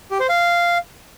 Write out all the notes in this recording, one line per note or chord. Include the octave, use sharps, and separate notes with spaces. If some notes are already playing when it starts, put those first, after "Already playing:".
G4
C5
F5